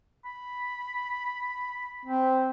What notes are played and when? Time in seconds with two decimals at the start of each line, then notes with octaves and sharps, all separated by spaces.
0.25 B5
2.05 C4